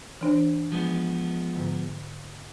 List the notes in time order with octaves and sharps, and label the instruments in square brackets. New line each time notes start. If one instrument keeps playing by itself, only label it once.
[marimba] E3 D4 C5
[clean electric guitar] F3 G#3 B3
[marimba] G#2 D3